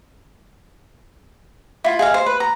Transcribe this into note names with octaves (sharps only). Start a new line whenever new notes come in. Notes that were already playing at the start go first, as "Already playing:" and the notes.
E4 F4
G#4 D#5 F5
C5
B4
A#5